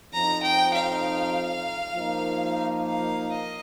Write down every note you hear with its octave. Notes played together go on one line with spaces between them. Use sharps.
F2 F3 D#4 A#5
G5
F5
F3 A#3 D#4
F5
D#5